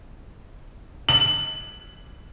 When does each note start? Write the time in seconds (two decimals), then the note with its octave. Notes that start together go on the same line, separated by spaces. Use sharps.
1.09 F#7